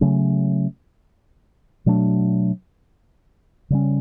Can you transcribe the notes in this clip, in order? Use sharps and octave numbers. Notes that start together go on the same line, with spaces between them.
C#3 F#3 A3 C#4
B2 F#3 A3 D4
C#3 G3 C#4